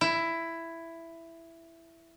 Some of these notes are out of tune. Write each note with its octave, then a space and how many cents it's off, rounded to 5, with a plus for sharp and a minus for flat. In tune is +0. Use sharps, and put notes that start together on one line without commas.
E4 +10